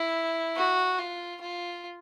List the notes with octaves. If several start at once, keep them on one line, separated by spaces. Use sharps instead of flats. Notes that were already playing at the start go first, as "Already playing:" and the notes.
Already playing: E4
F#4
F4
F4